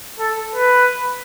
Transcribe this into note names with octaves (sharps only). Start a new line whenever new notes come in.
A4
B4